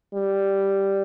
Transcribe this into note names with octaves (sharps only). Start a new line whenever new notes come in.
G3